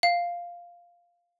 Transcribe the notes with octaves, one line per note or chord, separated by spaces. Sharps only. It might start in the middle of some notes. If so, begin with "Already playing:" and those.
F5